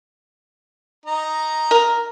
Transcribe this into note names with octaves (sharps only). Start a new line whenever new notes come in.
D#4 D#5 A#5
A#4